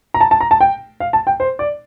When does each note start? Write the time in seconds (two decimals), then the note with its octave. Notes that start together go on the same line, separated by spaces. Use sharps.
0.14 A#5
0.21 A5
0.31 A5
0.40 A#5
0.51 A5
0.61 G5
1.00 F5
1.13 A5
1.27 G5
1.40 C5
1.59 D5